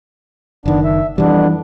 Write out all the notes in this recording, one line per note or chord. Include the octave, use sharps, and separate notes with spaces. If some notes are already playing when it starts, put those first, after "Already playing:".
F#1 D#3 B3 D4
E5
F2 E3 G3 B3 D4